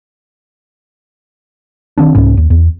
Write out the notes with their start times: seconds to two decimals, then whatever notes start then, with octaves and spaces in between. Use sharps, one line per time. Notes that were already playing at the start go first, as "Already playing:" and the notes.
1.98 D#3 C4 D4
2.15 C2 G#2 C#4
2.37 D#2
2.50 E2